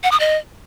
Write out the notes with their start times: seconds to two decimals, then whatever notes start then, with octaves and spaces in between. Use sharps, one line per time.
0.03 F#5
0.12 D#6
0.20 D#5